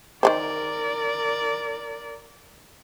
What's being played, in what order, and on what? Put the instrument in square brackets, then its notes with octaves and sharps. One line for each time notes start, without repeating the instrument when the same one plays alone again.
[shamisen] D#3 A3 C5 [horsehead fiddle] A#4 D5